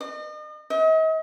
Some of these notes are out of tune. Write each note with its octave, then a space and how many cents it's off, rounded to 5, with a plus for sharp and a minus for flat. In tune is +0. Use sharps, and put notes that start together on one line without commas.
D#5 -40
D#5 +40